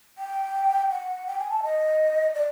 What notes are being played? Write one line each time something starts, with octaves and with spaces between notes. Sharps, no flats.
G5
F#5
G5
G#5
A5
D#5
D5